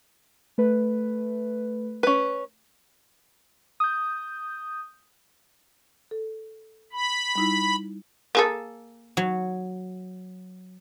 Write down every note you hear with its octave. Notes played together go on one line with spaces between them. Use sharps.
A3 B4
C#4 B4
D#6 G6
A4
B5
G3 D#4 E4
A#3 G#4 A4
F#3